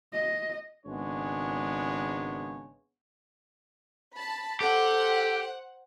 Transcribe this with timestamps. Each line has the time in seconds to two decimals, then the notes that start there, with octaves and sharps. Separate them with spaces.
0.13 D#5
0.86 G#1 C#3 G#3 B3 D4 C#5
4.13 A5 B5
4.61 G4 A4 C5 F#5